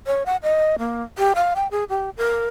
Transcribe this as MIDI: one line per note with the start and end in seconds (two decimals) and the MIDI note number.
0.07 0.23 73
0.26 0.37 78
0.43 0.76 75
0.79 1.03 58
1.18 1.33 67
1.35 1.53 77
1.56 1.67 79
1.71 1.84 68
1.89 2.10 67
2.17 2.48 70